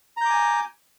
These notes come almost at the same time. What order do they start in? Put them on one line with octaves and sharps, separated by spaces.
A#5 G6 D6 G#5